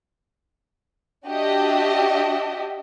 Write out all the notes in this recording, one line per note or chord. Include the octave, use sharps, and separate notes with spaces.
D4 F#4 G4 D#5 E5